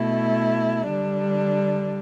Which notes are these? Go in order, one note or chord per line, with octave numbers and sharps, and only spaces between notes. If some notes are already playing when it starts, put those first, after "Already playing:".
Already playing: B2 A3 E4
D3 G3 D4